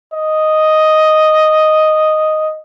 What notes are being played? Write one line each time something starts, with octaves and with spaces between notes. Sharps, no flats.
D#5